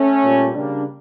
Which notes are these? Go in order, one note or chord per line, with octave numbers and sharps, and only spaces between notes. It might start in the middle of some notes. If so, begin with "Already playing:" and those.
Already playing: A3 C#4
A#2 G3
C#3 G3 A#3 D4